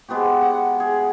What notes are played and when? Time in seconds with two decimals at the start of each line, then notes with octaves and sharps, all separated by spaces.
0.08 G#3 B3 F#4 G4
0.42 F#5
0.80 G#4